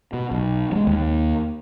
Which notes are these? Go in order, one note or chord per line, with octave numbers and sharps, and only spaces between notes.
B2
B1
F#3 G#3
D#2